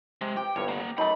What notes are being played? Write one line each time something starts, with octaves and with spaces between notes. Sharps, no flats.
C3 G#3
G4 G5
G1 C2 G2 C#5
A#3 F#5
F#2 A3 D#4 A5 B5